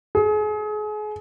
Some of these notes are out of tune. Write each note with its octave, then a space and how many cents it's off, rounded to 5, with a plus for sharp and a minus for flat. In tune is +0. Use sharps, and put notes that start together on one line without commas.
G#4 +35